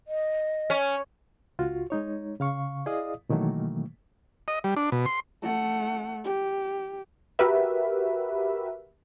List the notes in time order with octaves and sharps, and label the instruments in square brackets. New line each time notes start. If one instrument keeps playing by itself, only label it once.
[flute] D#5
[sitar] C#4
[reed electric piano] C#2 F4 F#4
G#3 D#4 C#5
C#3 F5 C#6
E4 G#4 D5 D#5 F5 D#6
B2 D#3 E3 F#3 A3 A#3
[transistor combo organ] D#5
G3
D4
B2
C6
[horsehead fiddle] A3 F#5
G4
[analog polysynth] F#4 G4 A#4 B4 E5